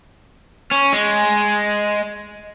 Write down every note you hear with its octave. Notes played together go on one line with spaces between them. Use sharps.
C#4
G#3